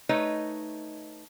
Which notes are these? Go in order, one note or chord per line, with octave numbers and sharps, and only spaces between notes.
A3 D#4 B4 C#5 D#5